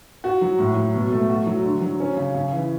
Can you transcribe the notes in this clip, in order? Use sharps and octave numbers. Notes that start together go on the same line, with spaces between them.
F#4
F#3
A2
F#3
B2
A3
F#4
F#3
D3
F#3
C#4
C#3
C#3
E3